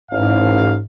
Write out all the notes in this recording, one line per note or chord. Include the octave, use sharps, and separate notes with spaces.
A1 G#2 F5